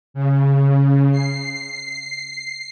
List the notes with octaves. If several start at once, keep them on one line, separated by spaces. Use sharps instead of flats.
C#3
C7